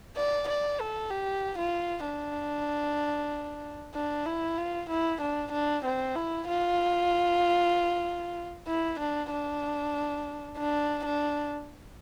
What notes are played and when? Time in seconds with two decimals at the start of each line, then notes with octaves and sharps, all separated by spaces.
0.16 D5
0.48 D5
0.80 A4
1.10 G4
1.58 F4
2.05 D4
3.94 D4
4.26 E4
4.58 F4
4.89 E4
5.21 D4
5.52 D4
5.85 C4
6.15 E4
6.47 F4
8.68 E4
9.00 D4
9.31 D4
10.57 D4
11.05 D4